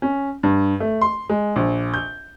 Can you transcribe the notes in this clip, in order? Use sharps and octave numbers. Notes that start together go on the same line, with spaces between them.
C#4
G2
A3
C6
G#3
A#1
G6